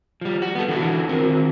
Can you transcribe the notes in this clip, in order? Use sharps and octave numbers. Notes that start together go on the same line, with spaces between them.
F3 G3
F#4
B3 A4
D3 E3 E4 F#4
D#3 C4 A#4